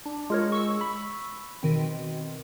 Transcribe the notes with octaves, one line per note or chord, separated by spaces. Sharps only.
D4
G#3 F4 A#4 C#5
C#6 E6
B5
B2 D#3 C4